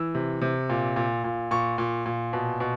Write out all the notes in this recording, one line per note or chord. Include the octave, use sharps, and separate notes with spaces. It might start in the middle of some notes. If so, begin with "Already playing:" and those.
Already playing: E3 E6
C3
C3
A#2
A#2
A#2
A#2 C#6
A#2
A#2
B2
B2